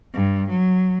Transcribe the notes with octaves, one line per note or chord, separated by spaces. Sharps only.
G2
F#3